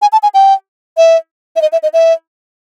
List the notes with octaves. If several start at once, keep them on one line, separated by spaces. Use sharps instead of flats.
G#5
A5
G#5
G5
E5
E5
D#5
E5
D#5
E5